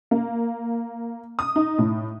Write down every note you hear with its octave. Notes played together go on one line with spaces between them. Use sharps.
A#3
D#6
D#4
A2